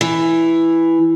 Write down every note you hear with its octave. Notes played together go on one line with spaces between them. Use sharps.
E3